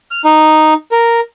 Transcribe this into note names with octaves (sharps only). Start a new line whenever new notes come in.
F6
D#4
A#4